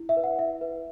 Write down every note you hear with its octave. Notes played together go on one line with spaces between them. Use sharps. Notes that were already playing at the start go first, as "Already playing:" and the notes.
Already playing: E4
E5
B4
F#5
E4 E5
B4